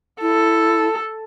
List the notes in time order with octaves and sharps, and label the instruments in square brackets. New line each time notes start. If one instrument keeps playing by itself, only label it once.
[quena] E4 [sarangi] A4